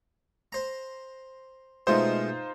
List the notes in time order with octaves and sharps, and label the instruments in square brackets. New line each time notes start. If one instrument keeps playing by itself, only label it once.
[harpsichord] C5 A#5
[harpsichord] B2 G#3 A3 [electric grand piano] D#4 F4 C5